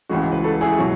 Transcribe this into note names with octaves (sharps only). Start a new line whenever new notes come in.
C#2 C#3 E3 G#3 F#4
B4
F#4 A4
E4 G#4
B2 F#3 F#4